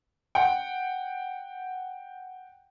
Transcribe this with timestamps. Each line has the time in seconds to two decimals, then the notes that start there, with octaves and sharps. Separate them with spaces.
0.35 F#5 G5